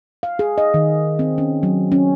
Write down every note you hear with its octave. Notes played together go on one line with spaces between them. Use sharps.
F5
G#4
D#5
D#3
C4
C#4
F#3
C#4